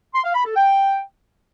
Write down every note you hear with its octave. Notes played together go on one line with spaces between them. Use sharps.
C6
F5
B5
A4
G5